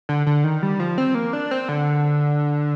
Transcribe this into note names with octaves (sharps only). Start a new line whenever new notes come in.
D3
D3
D#3
G3
F3
C4
A#3
D4
C4
D3